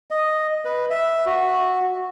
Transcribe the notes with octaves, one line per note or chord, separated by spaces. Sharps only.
D#5
B4
E5
F#4